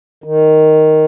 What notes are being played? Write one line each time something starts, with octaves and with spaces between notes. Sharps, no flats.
D#3